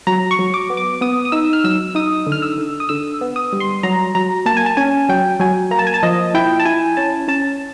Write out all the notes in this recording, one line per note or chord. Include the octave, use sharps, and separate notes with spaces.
F#3 A#5
C#6
F#3
D6
B3
D6
B3 D#6
D#6
D#4 E6
F6
F#3 E6
D#4 D#6
D3
F6
E6
D3
D#6
D3 E6
B3
D#6
G3
C6
F#3 A#5
F#3 A#5
A#3 A5
G#5
A5
C#4 G#5
F#3 G5
F#3 G#5
A#3 A#5
A5
G#5
A5
F3 D#5
E4 G5
A5
E4 G#5
C#4 A5
C#4 A5